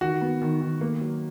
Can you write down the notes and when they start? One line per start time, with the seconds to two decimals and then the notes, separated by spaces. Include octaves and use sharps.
0.01 D#3 F#4
0.21 B3
0.41 D#3
0.61 D#3
0.81 A#3
1.01 F#3